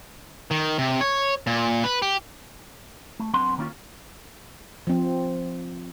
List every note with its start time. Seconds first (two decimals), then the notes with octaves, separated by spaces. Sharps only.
0.51 D#3
0.78 C3
1.01 C#5
1.47 A#2
1.84 B4
2.02 G4
3.20 A3
3.34 F#2 B3 C4 D4 A#5 C6
3.58 D#3 A#3 C#4 D#4 F4
4.87 F3 C4